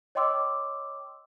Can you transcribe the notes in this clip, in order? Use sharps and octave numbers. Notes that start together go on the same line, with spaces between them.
C#5 D#5 G5 C6 D6 E6